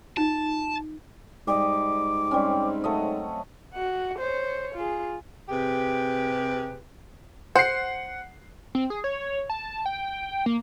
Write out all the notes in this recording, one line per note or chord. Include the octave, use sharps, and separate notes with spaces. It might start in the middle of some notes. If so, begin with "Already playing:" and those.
D#4 F4 A5
G#2 G3 D#5 D6
G3 C4 C#4
F#3 A3 D#5
F#4 F#5
C5 C#5
F4 G#4
C3 G4 G#4 B4
C5 F#5 C7
C4
G#4
C#5
A5
G5
A#3